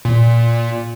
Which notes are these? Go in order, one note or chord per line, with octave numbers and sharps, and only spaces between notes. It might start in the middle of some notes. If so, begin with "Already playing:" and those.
A#2